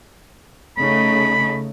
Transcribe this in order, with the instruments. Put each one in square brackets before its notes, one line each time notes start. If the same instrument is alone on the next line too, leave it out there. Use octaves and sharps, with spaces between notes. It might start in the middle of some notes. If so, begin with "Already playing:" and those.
[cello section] C#3 A3 D#4 [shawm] B5